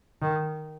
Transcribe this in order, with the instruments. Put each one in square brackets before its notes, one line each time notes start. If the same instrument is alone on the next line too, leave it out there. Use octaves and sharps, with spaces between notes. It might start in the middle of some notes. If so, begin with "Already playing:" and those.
[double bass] D#3